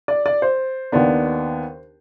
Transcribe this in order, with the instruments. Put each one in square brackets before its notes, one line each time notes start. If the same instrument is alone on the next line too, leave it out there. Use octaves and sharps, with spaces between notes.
[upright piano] D5
D5
C5
D#2 D#3 B3 D4